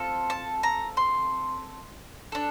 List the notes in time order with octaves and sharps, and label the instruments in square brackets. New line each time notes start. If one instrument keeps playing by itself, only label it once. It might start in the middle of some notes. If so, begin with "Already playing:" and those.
Already playing: [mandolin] C4 F4 A4
A5
A#5
C6
D4 A4